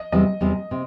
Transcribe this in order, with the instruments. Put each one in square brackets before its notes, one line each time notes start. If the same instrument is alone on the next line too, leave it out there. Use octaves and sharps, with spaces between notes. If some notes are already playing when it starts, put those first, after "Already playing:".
Already playing: [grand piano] D#5
[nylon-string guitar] E2 C3 E3 G3 [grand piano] D#5
[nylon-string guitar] E2 C3 E3 G3
C3